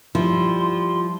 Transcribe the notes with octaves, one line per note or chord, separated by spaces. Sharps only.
F3 G3 E4 C6